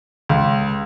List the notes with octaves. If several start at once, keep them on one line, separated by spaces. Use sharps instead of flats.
C#2